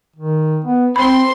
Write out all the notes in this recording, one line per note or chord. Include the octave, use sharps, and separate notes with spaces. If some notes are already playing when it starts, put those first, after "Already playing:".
D#3
B3
C4 C5 B5 C6